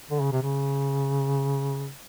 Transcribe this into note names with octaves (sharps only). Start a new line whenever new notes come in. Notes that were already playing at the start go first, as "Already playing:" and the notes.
D3
C#3
C3
C#3